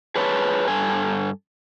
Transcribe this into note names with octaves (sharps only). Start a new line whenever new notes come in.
G#4 B4 C#5 F5 A5
G2 A4 G#5